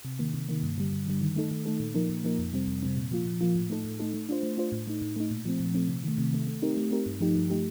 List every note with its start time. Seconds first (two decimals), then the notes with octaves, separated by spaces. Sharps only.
0.05 C3
0.19 D#3 A#3
0.34 C3
0.49 D#3 A#3
0.63 G2
0.78 D3 G3
0.93 G2
1.07 D3 G3
1.21 D#3
1.36 A3 D#4 A4
1.51 D#3
1.65 A3 D#4 A4
1.80 A#2
1.94 F3 A#3 D#4 A#4
2.09 A#2
2.24 F3 A#3 D#4 A#4
2.39 F2
2.53 C3 G3 C4
2.67 F2
2.83 C3 G3 C4
2.97 A#2
3.11 F3 A#3 F4
3.26 A#2
3.41 F3 A#3 F4
3.55 A2
3.70 A3 D#4 A4
3.85 A2
4.00 A3 D#4 A4
4.14 A3
4.29 D4 F4 C5
4.43 A3
4.58 D4 F4 C5
4.72 A2
4.87 A3 D#4
5.02 A2
5.16 A3 D#4
5.31 A#2
5.45 F3 A3 C4
5.60 A#2
5.75 F3 A3 C4
5.89 C3
6.04 D#3 A3
6.18 C3
6.33 D#3 A3
6.47 A3
6.62 C4 D#4 G4 A#4
6.77 A3
6.91 C4 D#4 G4 A#4
7.06 G2
7.21 F3 A3 D#4 G4
7.35 G2
7.50 F3 A3 D#4 G4